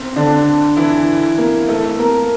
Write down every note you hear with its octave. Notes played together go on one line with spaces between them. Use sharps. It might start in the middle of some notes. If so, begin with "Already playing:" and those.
Already playing: C4
D3 D4
E3 E4
A#3
A3 A4
A#3 A#4